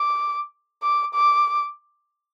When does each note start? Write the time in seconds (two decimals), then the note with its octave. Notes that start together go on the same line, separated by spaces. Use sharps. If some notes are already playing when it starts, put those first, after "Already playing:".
Already playing: D6
0.83 D6
1.14 D6